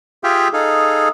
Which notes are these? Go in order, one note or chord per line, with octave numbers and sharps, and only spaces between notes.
F4 G4 G#4 E5 F5 G5
D#4 G#4 A4 F5